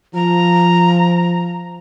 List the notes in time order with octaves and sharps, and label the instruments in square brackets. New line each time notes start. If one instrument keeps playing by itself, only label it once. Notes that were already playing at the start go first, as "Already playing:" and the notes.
[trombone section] F3 [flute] A#5